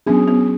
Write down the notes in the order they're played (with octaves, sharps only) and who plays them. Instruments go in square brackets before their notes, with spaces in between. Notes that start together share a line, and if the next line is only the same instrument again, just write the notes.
[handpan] F#3 C#4 G#4 [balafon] B3 D4
[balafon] B3